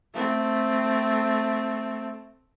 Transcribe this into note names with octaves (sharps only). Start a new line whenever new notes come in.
A3 C4